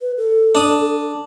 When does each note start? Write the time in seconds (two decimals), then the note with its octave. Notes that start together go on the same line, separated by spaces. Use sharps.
0.01 B4
0.17 A4
0.55 D4 D#6